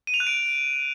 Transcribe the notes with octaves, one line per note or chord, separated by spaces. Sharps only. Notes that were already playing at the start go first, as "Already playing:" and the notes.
D#7
F7
F#6
D7